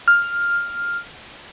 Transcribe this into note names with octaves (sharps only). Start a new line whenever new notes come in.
F6